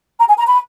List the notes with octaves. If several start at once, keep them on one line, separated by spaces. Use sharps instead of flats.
A#5
G#5
A#5
B5